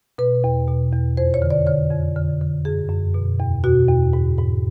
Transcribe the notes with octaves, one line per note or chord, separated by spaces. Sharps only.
B2 B4
E2
B2
E2
F2 C5
C#5
D3
D5
D3 C#5
F2
D3
D3
F#2 G#4
F#2
B2
E2
B2 F#4
E2
G#2
G#2